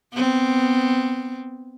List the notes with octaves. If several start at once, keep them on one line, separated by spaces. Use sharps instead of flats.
B3 C4